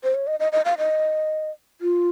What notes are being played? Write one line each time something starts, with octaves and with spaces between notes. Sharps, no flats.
C5
C#5
D#5
D#5
D#5
F5
D#5
F4